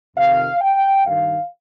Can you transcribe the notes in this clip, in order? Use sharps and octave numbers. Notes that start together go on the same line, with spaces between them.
F2 C3 D#3 F5
G5
G2 D#3 F5